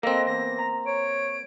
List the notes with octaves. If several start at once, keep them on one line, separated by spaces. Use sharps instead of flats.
A#3 C4 A4 D#5 A#6
E2 A#6
A#5
C#5 D7